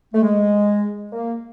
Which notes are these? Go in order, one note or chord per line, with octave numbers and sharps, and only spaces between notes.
A3
G#3
A#3